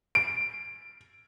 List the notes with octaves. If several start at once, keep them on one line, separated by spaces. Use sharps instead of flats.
D7